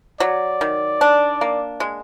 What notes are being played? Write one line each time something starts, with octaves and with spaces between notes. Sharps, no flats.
F#3 D5
D#3
D4
A#3
G#3